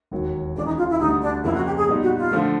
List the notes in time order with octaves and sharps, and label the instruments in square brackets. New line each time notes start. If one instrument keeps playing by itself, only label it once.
[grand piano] E1 D#2 D#3 F#3 A#3
[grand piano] C#2 C#3 E3 [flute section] D4
[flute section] D#4
F4
E4
[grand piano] D2 D3 G3 [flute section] D#4
[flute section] D4
[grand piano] F2 C#3 F3 A#3 [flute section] E4
[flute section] F#4
G4
G#4
[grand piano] A#2 G3 B3 D#4
[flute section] F#4
F4
[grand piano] D3 F3 A3